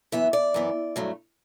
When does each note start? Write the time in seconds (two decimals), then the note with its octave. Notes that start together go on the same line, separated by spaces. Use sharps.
0.12 F#2 E3 B3 E5
0.33 D5
0.54 F#2 E3 B3
0.96 G2 F#3 A3